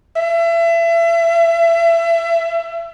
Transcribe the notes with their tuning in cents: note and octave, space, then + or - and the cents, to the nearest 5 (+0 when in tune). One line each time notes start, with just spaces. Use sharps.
E5 +30